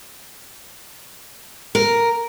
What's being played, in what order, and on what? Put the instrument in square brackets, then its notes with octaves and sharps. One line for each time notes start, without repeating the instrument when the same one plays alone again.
[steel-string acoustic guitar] A#4